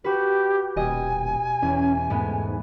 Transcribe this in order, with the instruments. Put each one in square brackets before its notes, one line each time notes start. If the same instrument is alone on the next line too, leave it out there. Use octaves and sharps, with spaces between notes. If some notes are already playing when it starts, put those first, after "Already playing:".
[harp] F#4 B4 [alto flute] G4
[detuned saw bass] D#1 [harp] B2 G4 D#5 [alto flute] G#5
[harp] E2 [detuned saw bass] C#4
[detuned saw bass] G#2 [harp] G#3 A3 B3